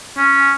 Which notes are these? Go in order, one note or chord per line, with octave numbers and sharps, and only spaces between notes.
C#4